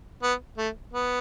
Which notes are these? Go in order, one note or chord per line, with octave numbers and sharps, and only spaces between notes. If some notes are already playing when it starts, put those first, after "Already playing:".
B3
A3
B3